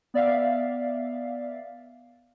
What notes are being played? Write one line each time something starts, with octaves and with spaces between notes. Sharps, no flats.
B3 D5 E5 F5